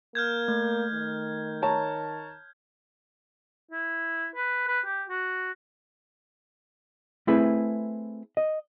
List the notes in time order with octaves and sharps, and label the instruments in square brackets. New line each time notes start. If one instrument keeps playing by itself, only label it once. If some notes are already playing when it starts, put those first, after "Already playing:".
[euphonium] A#3 [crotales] F6 G6 G#6
[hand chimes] A3
[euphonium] D#3
[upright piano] C#5 A5 A#5
[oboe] E4
B4
B4
G4
F#4
[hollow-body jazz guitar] A3 C4 E4 G#4 B4
D#5